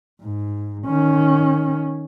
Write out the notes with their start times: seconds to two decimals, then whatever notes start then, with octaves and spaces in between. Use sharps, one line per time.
0.22 G#2
0.87 D#3 C#4